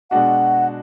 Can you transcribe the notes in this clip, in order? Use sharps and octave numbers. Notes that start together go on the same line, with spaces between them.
B2 G#3 D4 F#4 F#5